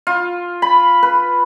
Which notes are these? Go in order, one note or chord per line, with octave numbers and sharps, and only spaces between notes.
F4
B5
B4